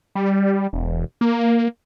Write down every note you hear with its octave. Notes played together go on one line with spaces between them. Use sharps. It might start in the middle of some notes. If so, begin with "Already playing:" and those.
G3
E1
A#3